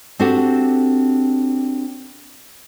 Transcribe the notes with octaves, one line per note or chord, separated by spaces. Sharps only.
C4 D4 F#4 G4 A4